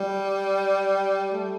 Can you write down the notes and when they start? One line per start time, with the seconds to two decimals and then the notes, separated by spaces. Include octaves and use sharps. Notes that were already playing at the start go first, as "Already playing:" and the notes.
Already playing: G3
1.32 A3